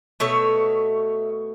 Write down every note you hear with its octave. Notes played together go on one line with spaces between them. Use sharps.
B2 A3 C#5 E5